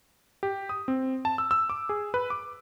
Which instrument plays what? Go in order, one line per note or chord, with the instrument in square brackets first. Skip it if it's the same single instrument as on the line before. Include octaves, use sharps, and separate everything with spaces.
[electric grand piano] G4
D#6
C4
A5
E6
E6
D6
G#4
B4
D6